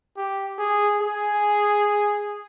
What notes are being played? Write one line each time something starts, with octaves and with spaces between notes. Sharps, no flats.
G4
G#4
G#4